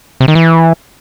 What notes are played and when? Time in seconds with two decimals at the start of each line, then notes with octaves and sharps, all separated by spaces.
0.21 C3
0.28 D#3
0.35 E3